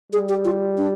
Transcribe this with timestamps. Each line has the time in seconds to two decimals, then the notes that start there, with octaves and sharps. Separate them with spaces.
0.12 G3 G#4
0.28 G4
0.45 F4
0.78 D4